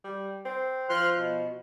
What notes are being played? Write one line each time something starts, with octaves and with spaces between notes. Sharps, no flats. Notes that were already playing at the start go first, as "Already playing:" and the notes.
G3
C4
F3 C6 F6 F#6
B2